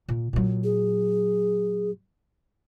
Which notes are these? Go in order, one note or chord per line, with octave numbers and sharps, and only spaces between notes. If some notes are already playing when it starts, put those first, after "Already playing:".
A#2
A#2 F#3
G#4